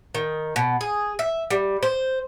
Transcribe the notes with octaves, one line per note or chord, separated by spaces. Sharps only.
D#3
B2
G#4
E5
G3
C5